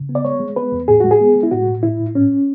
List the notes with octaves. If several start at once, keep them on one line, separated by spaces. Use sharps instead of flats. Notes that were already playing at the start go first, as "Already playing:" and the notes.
Already playing: C#3
B3
D5
G#3 C#5
G#3
B3 B4
E2
A2 G#4
G#3 F#4
G#4
B3
G#3
E4
A2 F#4
A2
A2 E4
A2
G#2 C#4